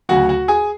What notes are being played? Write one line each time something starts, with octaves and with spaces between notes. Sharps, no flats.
D2 C#3 F#3 F#4 F#5
F#4 F#5
G#4 G#5